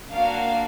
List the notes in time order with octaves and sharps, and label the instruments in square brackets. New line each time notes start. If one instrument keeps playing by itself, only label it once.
[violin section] A#3 D4 F#4 F5